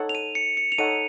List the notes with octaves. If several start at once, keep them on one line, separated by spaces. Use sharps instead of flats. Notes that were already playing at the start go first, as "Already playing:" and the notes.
Already playing: D#4 A4 C#5 F#5
F7
D#7
C#7
C#7
F7
D#4 A4 C#5 F#5 D#7